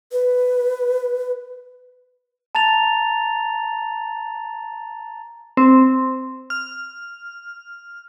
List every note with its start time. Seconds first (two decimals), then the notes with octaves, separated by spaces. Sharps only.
0.12 B4
2.55 A5 A#5 A6 F7
5.57 C4
6.50 F6